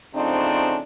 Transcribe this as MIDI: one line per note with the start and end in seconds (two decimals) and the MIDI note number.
0.14 0.80 49
0.14 0.80 53
0.14 0.80 57
0.14 0.80 60
0.14 0.80 62
0.14 0.80 63